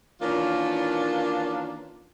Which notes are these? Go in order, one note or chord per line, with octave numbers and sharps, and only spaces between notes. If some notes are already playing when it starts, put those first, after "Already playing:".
D#3 E3 A#3 C#4 D4 F4